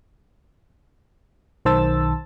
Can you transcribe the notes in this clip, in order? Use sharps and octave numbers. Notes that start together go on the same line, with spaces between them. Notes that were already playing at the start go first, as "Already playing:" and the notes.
B1 D#3 C5 A5 E6 A6